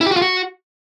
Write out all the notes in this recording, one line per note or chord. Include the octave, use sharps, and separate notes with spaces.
E4
G4
F#4
F4
F#4